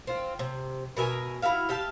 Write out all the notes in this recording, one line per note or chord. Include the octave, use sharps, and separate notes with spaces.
C4 F4
C3
B2 A#4 E5 G#5
E4 F#4 E5 F5
G4 E5 F5 A5